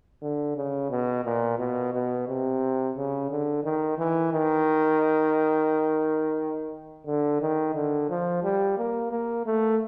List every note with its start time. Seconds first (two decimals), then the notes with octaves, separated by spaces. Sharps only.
0.22 D3
0.56 C#3
0.90 B2
1.25 A#2
1.58 B2
1.94 B2
2.28 C3
2.96 C#3
3.31 D3
3.64 D#3
3.98 E3
4.32 D#3
7.06 D3
7.41 D#3
7.75 D3
8.09 F3
8.44 G3
8.78 A#3
9.11 A#3
9.46 A3